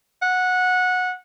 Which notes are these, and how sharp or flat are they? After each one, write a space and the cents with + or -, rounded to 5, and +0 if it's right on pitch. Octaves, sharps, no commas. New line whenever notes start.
F#5 -15